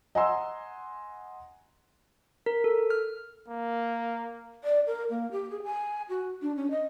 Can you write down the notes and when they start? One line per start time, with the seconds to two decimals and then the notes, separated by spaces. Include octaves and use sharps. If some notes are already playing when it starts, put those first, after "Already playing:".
0.15 D#5 F#5 G#5 A#5 C6 E6
2.46 A#4
2.64 A4
2.90 F6
3.48 A#3
4.64 D5
4.87 A#4
5.10 A#3
5.31 G4
5.50 G#4
5.63 G#5
6.09 F#4
6.42 D4
6.56 C#4
6.70 D#5